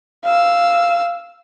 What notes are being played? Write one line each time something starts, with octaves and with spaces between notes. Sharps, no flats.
F5 E6